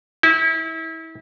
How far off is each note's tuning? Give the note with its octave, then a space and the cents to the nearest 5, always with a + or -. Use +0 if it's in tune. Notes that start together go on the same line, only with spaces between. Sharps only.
E4 -30